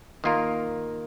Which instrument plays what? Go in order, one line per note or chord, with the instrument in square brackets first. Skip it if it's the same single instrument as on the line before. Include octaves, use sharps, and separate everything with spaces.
[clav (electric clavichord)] D#3 A#3 F4 A#4